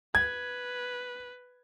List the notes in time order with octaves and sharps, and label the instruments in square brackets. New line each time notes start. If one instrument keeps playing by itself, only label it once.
[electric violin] B4 [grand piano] G#6